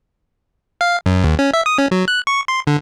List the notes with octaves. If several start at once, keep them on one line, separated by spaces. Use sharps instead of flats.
F5
F#2
D#2
C#4
E5
D#6
C#4
F#3
F#6
C#6
C6
D3